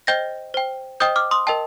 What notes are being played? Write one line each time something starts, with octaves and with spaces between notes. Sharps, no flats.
C5 D#5 G5 G6 A#6
C5 G5
C5 D#5 G5 D#6 G6
D6 F6
C6 D#6
A#4 D#5 G5 A5